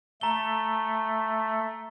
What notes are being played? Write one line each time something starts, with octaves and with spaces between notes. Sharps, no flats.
A3 A#5 G7